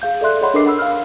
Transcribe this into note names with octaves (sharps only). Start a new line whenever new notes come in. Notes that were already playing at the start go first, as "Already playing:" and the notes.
G#4 F5 G6
A4 D5 E5 C6 F#6
G#4 C#5 D#5 F#5 B5 C6
D4 A4 A#4 D#5 D6 C7
F#5 B5 E6
F5 F6